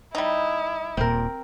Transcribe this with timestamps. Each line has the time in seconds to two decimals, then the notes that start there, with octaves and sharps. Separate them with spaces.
0.15 G3 D#4 E4
0.97 D#1 A#2 C4 A#4